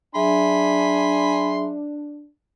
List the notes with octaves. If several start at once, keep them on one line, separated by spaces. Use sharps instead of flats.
F#3 D4 G#4 E5 G#5 B5 C6